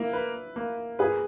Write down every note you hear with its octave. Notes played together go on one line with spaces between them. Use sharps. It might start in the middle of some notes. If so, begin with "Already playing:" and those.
Already playing: A#3 E4
B4
A#3
G#4 B4